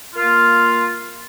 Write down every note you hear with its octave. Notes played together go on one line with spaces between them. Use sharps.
A#3 F4